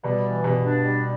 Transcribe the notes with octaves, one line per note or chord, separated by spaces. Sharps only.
B2 G3 B3
E3
G2 B2 B3
D4
G3